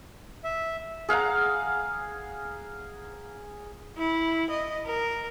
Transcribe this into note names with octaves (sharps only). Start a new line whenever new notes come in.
E5
G#4 F5 F#5 A#5
E4
D#5
A#4